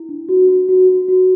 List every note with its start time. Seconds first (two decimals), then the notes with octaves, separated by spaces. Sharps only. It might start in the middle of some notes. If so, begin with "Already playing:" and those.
Already playing: E4
0.09 D4
0.29 F#4
0.48 F#4
0.69 F#4
0.88 F#4
1.08 F#4